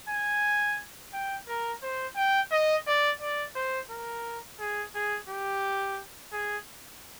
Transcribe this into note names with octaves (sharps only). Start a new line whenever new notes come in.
G#5
G5
A#4
C5
G5
D#5
D5
D5
C5
A#4
G#4
G#4
G4
G#4